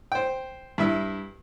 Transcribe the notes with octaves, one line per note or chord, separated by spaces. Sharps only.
C5 G5
G2 E4 E5